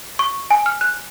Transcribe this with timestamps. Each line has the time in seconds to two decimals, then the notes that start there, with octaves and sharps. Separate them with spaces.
0.19 C#6
0.51 G#5
0.66 F6
0.81 F#6